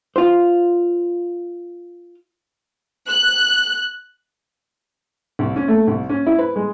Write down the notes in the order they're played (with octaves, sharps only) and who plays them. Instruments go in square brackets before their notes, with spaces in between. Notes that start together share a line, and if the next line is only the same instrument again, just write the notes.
[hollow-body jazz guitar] F4 C5
[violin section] F#6
[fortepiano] C2
C#4
A3
C2
C#4
E4
B4
G#3